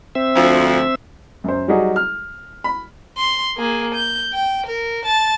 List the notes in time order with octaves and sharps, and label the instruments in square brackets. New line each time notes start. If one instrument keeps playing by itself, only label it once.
[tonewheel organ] C4 E5
[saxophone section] D2 F3
[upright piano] F#2 C5
F#3 G3 D#4 F#4 G#4
F6
B5
[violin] C6
A#3 G#4
G6
G5
A#4
A5 A6